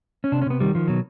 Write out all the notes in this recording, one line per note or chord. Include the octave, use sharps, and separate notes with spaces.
C#4
C3 D4
C#4
C3 B3
D#3 G3
D#3 F3
B2 F#3